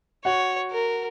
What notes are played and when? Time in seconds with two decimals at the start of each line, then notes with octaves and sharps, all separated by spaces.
0.25 F#4 C#5 F#5
0.72 A#4